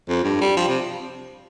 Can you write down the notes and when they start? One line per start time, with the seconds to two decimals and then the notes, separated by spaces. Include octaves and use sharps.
0.08 F2
0.24 G2
0.41 G3
0.56 F3
0.67 C3